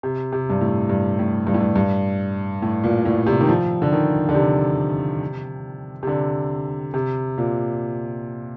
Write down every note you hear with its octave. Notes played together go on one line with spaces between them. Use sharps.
C3
C3
G2
A2
G2
A2
G2
A2
G2
G2
A2
A#2
A2
C3
D#3
F3
D3
D#3
D3
C3
C3
D3
C3
A#2